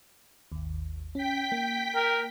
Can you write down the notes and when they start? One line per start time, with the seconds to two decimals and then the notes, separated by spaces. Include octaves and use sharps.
0.52 G#1 D#2
1.15 C#4 G5 B6
1.52 A#3
1.96 A#4